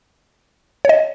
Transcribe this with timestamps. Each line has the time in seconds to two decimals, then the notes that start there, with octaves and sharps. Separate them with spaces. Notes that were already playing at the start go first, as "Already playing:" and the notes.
0.85 C#5
0.89 D#5